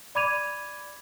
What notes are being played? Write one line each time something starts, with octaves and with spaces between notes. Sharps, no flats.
D5 B5 D6 G#6 D#7 F7